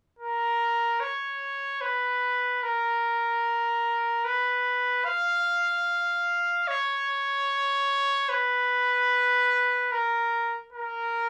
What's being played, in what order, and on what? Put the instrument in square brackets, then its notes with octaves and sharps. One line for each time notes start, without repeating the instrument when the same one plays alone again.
[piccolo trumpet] A#4
C#5
B4
A#4
B4
F5
C#5
B4
A#4
A#4